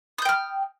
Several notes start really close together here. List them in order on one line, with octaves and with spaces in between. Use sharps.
D#6 G6 G5 F6